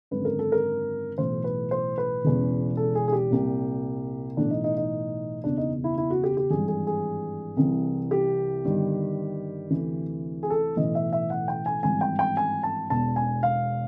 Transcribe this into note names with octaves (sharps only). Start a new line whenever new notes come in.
G#1 F#2 D3 B4
A#4
A4
A#4
B1 A2 E3 C5
B4
C5
B4
E1 E2 C#3 E3
A4
G#4
G#4
G4
C2 A#2
B1 A2 E3 D4
D#4
D#4
D#4
F#1 E2 B2 D4
D#4
E4
E4
F#4
G4
G4
G#1 G2 E3 G#4
G#4
G#4
C2 C3 E3
G4
G1 G2 D#3
D2 C3 E3
G#4
A4
B1 A2 E3 D#5
E5
E5
F#5
G5
G#5
G#1 G2 E3 G#5
G5
G5
G#5
A5
E1 E2 B2 A5
G#5
F5